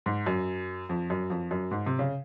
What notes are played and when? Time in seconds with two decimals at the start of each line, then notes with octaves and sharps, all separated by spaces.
0.06 G#2
0.26 F#2
0.89 F2
1.10 F#2
1.30 F2
1.51 F#2
1.71 G#2
1.86 C3
1.99 C#3